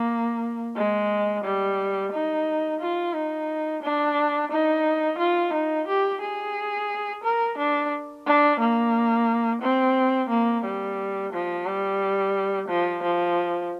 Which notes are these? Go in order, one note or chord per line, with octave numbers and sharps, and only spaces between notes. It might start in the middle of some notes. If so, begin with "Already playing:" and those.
Already playing: A#3
G#3
G3
D#4
F4
D#4
D4
D#4
F4
D#4
G4
G#4
A#4
D4
D4
A#3
C4
A#3
G3
F3
G3
F3
F3